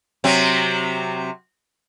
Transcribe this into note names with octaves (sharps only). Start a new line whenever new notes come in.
C3 F#3 C4